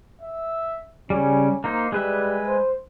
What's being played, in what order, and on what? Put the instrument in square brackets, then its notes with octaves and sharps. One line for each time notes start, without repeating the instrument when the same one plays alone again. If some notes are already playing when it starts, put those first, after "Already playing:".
[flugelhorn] E5
[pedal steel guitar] C#3 G3 [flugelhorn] C#4
[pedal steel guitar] A#3 D#4 C5
[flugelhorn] G3 [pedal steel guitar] G#3 B4 E5
[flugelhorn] C5